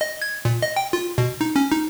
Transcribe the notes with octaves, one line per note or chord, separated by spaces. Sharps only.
D#5
G#6
A#2
D#5
G5
F4
B2
D#4
C#4
D#4